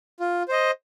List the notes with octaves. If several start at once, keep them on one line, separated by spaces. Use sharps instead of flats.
F4
C5 D#5